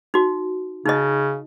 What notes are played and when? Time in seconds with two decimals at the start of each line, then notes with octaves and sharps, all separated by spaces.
0.14 D#4 F#4
0.86 C#3 D#4 D#5